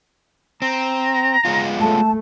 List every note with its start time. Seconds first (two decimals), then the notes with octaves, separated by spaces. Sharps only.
0.62 C4 A#5
1.45 G#3 B3 F4
1.81 A3 A5